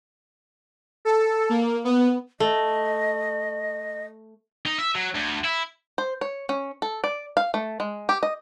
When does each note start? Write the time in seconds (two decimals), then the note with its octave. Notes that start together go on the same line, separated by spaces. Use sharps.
1.05 A4
1.49 A#3
1.84 B3
2.40 A3 D#5
4.66 D#4
4.79 E5
4.95 F#3
5.15 D2
5.45 E4
5.98 C5
6.21 C#5
6.49 C#4
6.82 A4
7.04 D5
7.37 F5
7.54 A3
7.80 G#3
8.09 G4
8.23 D#5